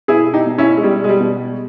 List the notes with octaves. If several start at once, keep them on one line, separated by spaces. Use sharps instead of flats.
B2 E4 G#4
D#4 G4
B2
C#4 E4
G#3
B2 G3
G#3
G3
B2